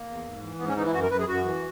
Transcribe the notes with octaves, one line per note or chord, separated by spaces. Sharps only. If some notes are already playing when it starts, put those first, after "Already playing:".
Already playing: A#3
E2
G#2
E3
G#2 B3
C#4
E3 D#4
E4
F#2 F#4
A#4
F#2 B4
G#4
F#2 F#4
E3